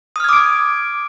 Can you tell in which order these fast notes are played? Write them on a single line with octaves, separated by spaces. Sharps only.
D#6 F6 G#6 D6 D7